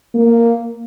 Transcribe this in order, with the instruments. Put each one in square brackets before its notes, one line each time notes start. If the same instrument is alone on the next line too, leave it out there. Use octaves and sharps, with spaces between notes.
[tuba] A#3